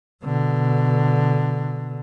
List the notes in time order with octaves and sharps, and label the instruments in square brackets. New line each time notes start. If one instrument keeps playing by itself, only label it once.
[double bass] B2 D3